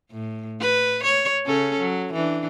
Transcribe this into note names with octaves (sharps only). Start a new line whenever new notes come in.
A2
B4
C#5
C#3 C#4 A4
F#3
E3 D4